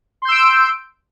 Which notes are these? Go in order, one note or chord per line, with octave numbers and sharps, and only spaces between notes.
C6 E6 G6 D7